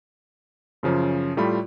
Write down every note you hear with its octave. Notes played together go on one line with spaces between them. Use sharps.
F#2 C#3 F3 C#4
A2 G3 A3 F4 B5